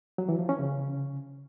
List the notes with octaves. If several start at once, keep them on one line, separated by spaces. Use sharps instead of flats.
F#3
E3
F3
C#4
C#3